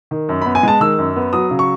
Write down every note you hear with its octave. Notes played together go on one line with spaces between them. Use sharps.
D#3
F#2
B5
B3
G#5
G#3 A5
D#3 E6
F#2
B3
F#3 D#6
C#3
C#6